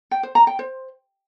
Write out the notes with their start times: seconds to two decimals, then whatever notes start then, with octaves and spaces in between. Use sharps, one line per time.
0.11 G5
0.23 C5
0.35 A#5
0.47 G5
0.59 C5